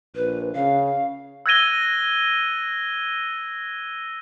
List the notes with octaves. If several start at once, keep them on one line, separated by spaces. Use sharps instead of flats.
A#1 B4
C#3 F5
E6 F#6 G#6 A#6 D#7 G7